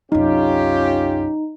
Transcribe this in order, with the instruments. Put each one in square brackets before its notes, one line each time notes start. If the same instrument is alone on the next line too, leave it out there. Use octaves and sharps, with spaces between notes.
[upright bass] C2 F#2 [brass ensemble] C#4 F4 G4 [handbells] D#4